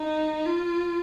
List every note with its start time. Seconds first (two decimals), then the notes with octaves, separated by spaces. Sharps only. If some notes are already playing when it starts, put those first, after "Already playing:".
Already playing: D#4
0.46 F4